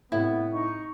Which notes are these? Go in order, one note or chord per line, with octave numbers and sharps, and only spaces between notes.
A2 C3 B3 E4
D#4 C#6